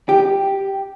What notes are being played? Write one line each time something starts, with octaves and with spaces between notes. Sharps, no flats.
G4